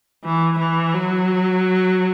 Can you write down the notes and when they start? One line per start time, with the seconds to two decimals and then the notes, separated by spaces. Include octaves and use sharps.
0.25 E3
0.59 E3
0.94 F#3